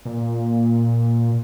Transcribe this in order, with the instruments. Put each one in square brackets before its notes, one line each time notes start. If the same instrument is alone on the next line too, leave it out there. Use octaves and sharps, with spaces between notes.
[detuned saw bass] A#2